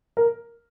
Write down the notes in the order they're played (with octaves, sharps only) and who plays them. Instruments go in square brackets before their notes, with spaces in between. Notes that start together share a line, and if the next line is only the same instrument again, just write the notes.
[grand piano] A#4